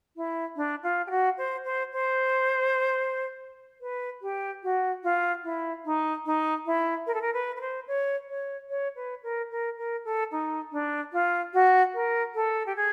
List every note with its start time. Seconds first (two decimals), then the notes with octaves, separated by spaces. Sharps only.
0.16 E4
0.56 D4
0.83 F4
1.07 G4
1.10 F#4
1.38 C5
1.64 C5
1.92 C5
3.81 B4
4.22 G4
4.63 F#4
5.03 F4
5.44 E4
5.85 D#4
6.25 D#4
6.66 E4
7.07 A#4
7.14 A4
7.22 A#4
7.33 B4
7.56 B4
7.61 C5
7.87 C#5
8.28 C#5
8.69 C#5
8.96 B4
9.23 A#4
9.51 A#4
9.77 A#4
10.05 A4
10.32 D#4
10.72 D4
11.13 F4
11.54 F#4
11.94 A#4
12.35 A4
12.66 G4
12.76 G#4